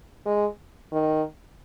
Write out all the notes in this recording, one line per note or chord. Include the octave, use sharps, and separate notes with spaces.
G#3
D#3